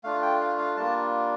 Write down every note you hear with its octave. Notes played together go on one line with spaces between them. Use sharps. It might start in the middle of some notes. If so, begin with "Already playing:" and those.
A3 D4 F4 F5
G5
F5
F5
G3 A#3 D4 F4 A5